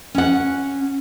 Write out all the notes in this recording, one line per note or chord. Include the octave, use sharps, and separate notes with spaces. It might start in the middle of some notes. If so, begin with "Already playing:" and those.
C#4 F#5